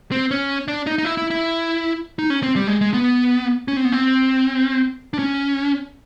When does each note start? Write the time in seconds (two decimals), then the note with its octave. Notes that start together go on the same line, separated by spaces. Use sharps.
0.12 C4
0.31 C#4
0.68 D4
0.87 D#4
0.98 D#4
1.05 E4
1.17 E4
1.30 E4
2.19 D#4
2.30 C#4
2.43 C4
2.56 G3
2.67 G#3
2.81 G#3
2.94 B3
3.68 C#4
3.77 C4
3.85 B3
3.92 C4
5.13 D4
5.19 C#4